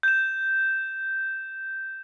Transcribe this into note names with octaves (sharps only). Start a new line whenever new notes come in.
G6 E7